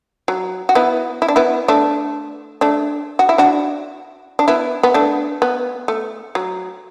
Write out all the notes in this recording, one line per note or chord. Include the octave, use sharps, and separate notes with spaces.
F#3
F#4
B3 E4
E4
D4
B3 E4
A3 D4
A3 D4
F#4
E4
D4 F#4
D4
B3 E4
B3
A3 D4
B3
A3
F#3